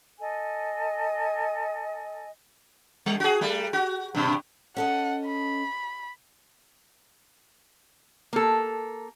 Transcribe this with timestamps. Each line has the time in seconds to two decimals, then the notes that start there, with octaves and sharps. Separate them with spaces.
0.19 A4 D#5 G#5
3.06 G3
3.20 F#4 G#4
3.41 G3 A3
3.73 F#4
4.15 G2 B2
4.77 C#4 A4 D#5 F#5
5.26 B5
8.33 A#3 A4